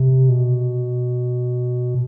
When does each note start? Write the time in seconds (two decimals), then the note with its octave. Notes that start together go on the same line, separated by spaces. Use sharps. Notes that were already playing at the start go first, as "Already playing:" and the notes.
Already playing: C3
0.29 B2